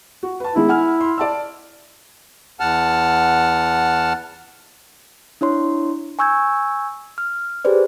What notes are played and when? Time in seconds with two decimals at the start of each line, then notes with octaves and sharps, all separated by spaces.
0.23 F#4
0.40 B4 A5
0.56 D#3 G#3 B3 E4
0.69 F#5 G#5 F6
1.01 C6
1.18 D5 A5 E6
2.60 E2 F#5 A5 F6
5.41 D4 E4 C#5 C6
6.19 G#5 C#6 E6 G6 G#6
7.18 F6
7.65 G4 G#4 B4 C5 D5